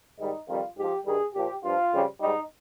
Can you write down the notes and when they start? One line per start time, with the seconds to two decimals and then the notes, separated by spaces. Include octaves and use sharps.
0.19 G#2 D#3 G3 D#4
0.48 F2 D#3 G3 F4
0.76 G#2 F3 G4
1.05 G2 D#3 G3 G#4
1.35 A#2 F3 G4
1.63 G2 F3 F4
1.92 F2 C#3 G3
2.20 G#2 G3 D#4